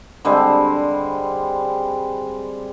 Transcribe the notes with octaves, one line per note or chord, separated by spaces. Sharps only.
D3 G3 G#3 C4